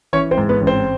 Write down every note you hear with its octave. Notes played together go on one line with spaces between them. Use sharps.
E3 C#4 C#5
C4 C5
G#2
B3 B4
A1
C4 C5